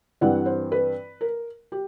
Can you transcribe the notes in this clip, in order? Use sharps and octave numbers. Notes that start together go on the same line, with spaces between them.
G2 E3 G3 C4 E4 F#5
C5
B4
A#4
G4